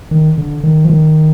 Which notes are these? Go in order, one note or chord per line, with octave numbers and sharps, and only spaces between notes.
D#3
D3
D#3
F3
D#3